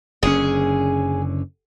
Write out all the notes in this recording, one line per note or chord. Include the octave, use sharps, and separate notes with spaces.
F#1 D3 C#4 G#4